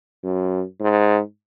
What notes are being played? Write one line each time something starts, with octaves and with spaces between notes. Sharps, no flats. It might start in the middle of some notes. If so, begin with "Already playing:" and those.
F#2
G#2